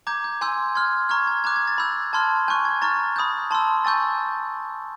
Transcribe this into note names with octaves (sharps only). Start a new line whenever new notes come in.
A#5 D6 G6 G#6
G6
G#5 C6 E6 G6
C6 F6 G#6
A#5 C#6 F6 G#6
G#6
A#5 D6 F#6 G#6
G#6
A6
B5 E6 G6
A5 C6 F6 G#6
G#5 C#6 F#6 G6
G#6
A#5 C#6 F6 A6
B5 D#6 G6
A5 C6 E6
G#5 C#6 E6 G6 A6